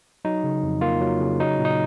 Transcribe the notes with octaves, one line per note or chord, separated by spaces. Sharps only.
F#3 D#4
C#3
F2
A#3 F4
F#3
C#3
F#3 D#4
A#2
D#4